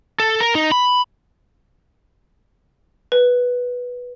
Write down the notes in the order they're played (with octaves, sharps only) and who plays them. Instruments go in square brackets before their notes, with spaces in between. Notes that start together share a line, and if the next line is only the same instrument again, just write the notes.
[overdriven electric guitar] A4
A#4
D#4
B5
[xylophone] B4